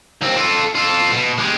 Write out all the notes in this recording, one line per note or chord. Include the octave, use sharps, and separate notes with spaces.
D#2 C4
F4 A4
F4 A4
B2
G#3 G4